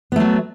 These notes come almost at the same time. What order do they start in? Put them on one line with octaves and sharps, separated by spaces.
B3 A3 F#3